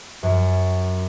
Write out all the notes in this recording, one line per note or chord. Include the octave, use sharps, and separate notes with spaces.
F#2